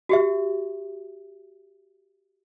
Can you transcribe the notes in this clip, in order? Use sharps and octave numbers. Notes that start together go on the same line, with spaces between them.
F#4 G4 E5